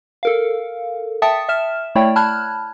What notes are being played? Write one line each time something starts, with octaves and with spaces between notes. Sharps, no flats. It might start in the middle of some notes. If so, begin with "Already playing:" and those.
A4 A#4 F5
E5 G5 A5 D#6 A6 C#7
E5 F6 E7
A3 E4 C#5 D5 G5
A5 B5 F6 F#6 G#6